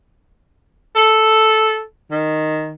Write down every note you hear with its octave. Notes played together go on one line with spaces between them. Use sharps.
A4
D#3